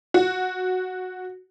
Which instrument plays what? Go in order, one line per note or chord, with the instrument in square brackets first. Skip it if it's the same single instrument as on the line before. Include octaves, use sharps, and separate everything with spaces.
[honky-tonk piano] F#4